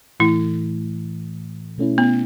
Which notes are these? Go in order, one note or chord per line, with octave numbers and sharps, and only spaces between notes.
A2 E3 A3 E4
B2 A3 C#4 E4
B3